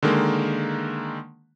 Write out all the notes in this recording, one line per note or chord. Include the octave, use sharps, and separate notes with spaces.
D3 D#3 G#3 A#3